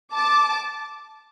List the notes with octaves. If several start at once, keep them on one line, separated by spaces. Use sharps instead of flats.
A5 D6